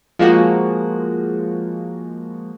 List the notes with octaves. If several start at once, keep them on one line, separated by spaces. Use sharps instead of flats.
F3 G#3 A#3 F#4